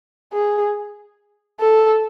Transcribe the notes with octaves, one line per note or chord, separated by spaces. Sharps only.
G#4
A4